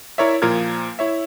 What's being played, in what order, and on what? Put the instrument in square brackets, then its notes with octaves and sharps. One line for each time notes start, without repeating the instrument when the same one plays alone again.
[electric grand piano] E4 A#4 C#5 D5 E5
A#2 F3 A#4 F6 G#6
E4 C#5 E5